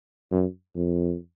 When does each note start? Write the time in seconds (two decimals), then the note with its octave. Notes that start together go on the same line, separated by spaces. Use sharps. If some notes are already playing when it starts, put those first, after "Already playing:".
0.31 F#2
0.75 F2